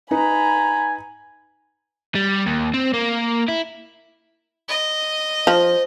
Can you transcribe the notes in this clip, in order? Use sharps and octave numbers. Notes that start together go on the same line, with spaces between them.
D#4 B4 G#5 A#5 B5
G3
D#2
C4
A#3
E4
D#5
F3 C5